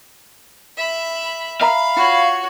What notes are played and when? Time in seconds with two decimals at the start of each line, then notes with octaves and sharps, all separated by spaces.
0.77 E5 B5
1.61 E5 F5 A#5 B5
1.97 F4 F#4 C#5